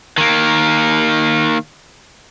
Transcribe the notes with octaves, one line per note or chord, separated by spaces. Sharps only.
D#3 A#3